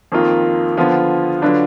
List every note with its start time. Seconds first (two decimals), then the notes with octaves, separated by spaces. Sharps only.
0.12 F2 D#3 A#3 F4
0.77 D3 F3 B3 F4
1.42 D3 F#3 D4 F4 B4